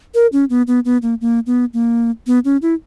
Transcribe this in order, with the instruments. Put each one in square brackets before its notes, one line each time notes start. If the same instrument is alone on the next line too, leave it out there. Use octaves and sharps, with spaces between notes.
[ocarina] A#4
C#4
B3
B3
B3
A#3
A#3
B3
A#3
B3
C#4
E4